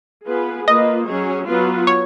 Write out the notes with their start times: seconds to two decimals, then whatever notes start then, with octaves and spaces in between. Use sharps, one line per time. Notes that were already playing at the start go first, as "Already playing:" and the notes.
0.27 B3 F4 G#4 B4
0.67 A#3 F4 B4 D#5
1.08 F#3 C#4 G#4 C#5
1.47 F#3 B3 F4 B4
1.87 C#5